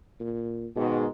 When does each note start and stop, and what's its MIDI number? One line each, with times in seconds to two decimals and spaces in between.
0.20 0.67 46
0.76 1.05 44
0.76 1.07 47
0.76 1.05 51
0.76 1.05 56